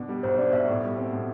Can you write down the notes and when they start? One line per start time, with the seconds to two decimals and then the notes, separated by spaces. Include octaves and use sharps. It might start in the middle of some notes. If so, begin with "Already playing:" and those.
Already playing: B2 D4
0.09 G3
0.23 B1 C5
0.38 D4 D5
0.53 B2 E5
0.68 A2
0.83 G3
0.97 C4
1.13 A2